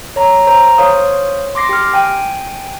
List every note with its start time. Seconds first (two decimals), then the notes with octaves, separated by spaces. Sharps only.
0.16 C#5 A#5
0.47 C5 A#5
0.78 C5 C#5 F5 D#6
1.55 C6 D6 A#6 C7
1.69 G4 F6
1.94 G5 G#5